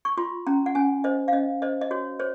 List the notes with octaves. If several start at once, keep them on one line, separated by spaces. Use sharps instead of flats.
C#6
F4 C6
C#4 A#5
F#5
C#4 G#5
C5 D#5
F5
C#4 D#5
C5 D#5
D#5
F#4 C#5
C5 C#5